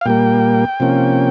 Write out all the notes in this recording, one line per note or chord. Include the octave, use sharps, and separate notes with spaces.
F5
A#2 G3 A#3 G5
C3 F3 A#3 C#4